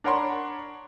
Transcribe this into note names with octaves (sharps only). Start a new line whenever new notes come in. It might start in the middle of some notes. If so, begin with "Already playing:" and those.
D4 A#4 C#5 F#5 B5 C6